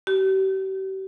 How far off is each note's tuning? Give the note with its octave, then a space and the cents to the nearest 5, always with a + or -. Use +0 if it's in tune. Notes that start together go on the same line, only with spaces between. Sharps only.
G4 -40